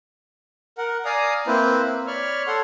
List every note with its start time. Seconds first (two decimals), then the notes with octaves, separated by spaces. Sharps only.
0.78 A#4 F#5
1.05 D5 F5 G#5 A#5 D#6
1.47 A#3 C4 E4 B4 C5
1.85 C4
2.07 C#5 D5 B5 C#6 F6
2.47 A4 C#5 F#5 C6